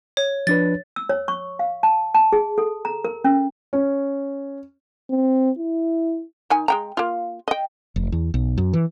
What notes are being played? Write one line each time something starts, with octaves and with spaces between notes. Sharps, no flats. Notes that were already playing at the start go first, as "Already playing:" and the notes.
C#5
F3 D4 B4 A6
E6
C#5
C#6
F5
A5
A5
G#4
A4
A#5
A#4
C#4
C#4
C4
E4
D#3 D#4 G#5
G#3 G5 A#5
A#3 F4
D#5 G5
F1
E2
B1
F#2
E3